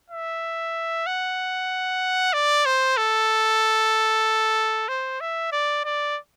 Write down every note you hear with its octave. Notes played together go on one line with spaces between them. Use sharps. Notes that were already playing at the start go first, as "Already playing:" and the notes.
E5
F#5
D5
C5
A4
C5
E5
D5
D5